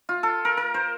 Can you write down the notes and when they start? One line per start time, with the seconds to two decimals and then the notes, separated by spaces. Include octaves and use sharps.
0.09 F4
0.23 A4
0.45 A#4
0.57 A#4
0.74 C5